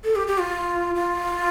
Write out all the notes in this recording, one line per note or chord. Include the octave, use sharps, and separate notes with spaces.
A4
G4
G4
F4
F4